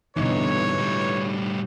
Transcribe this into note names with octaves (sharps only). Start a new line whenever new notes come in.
E2 G2 B2 D3 E3 D#4 C#5
A2 G3